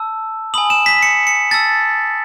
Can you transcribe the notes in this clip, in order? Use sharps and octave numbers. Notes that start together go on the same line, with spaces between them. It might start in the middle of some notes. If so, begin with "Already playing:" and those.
Already playing: A5 E6
G#5 B5 D#6 F#7
E7
B6
C#7
C#7
A5 E6 A6